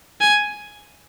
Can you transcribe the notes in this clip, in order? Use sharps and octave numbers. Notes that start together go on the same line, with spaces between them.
G#5